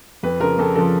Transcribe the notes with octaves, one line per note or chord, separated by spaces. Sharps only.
F2 B4
C#3 F3 A#4
F2 A4
C#3 F3 A4